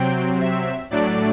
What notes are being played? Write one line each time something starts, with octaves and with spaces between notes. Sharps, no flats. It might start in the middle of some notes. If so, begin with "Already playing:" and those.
Already playing: C3 F#3 C4 G5
E5
A2 F#3 A3 D4 D5